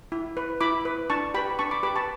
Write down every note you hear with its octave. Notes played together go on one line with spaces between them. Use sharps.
E4
B4
E4 B5 D6
B4
D4 A5 C#6
G4 B4 G5 B5
D4 A5 C#6
B5 D6
G4 B4 B5 D6
A5 C#6